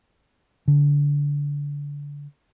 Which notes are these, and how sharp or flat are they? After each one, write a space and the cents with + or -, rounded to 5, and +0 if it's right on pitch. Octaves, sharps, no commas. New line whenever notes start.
D3 -25